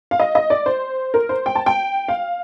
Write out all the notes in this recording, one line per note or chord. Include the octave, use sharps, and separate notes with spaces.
F5
D#5
D#5
D5
C5
A#4
C5
G5
A5
G5
F5